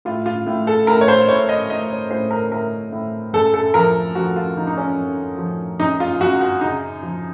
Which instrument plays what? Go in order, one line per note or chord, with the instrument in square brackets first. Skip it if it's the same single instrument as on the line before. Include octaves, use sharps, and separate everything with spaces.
[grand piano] A2 F4
F4
A2
A4
A2 A#4
C#5
C5
A2 C#5
D#5
A2 D#5
C#5
A2 C5
A#4
A2 A#4
A2
F#2 A4
A4
F3 A#4
F3 F#4
F4
F3 D#4
D#4
C#4
F#2
F3
F#2 D#4
F4
F#2 F#4
F#4
C#3 D#4
F3